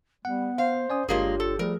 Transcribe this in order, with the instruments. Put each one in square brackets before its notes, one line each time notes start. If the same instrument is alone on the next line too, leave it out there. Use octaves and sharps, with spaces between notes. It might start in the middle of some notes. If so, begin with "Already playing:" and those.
[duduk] G3 [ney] B3 [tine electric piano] F#5
[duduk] C5 [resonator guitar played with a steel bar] F5
[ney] C#4 [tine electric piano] D5 G#5 D#6
[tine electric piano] G1 D4 C#5 [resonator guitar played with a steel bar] G#3 A#3 G#4 [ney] F4 [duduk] G4
[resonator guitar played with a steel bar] A4
[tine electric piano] F3 A3 [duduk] G3 [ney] G#4 [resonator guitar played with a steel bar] A#4